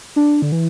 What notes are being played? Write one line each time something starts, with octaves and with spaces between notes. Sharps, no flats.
D4
D3
E3